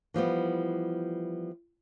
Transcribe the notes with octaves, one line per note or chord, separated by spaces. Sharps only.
E3 F3 G3 B3